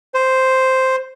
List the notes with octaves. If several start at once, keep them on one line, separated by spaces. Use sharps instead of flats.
C5